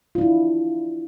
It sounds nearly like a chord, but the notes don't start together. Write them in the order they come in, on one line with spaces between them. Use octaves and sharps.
F4 D4 E4